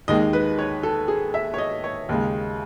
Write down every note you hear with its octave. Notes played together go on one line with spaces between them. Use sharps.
D#2 D#3 G#3 D#5
B4
C#5
A4
G#4
E5
C#5
D#5
C#5
D#2 C#3 G#3